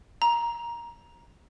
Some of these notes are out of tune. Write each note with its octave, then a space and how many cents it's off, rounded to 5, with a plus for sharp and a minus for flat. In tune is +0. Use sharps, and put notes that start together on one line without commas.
A#5 +15